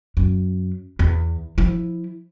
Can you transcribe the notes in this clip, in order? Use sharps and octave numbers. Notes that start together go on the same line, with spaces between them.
F#2
E2
F3 E4